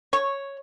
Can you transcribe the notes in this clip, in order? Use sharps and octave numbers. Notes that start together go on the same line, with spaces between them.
C#5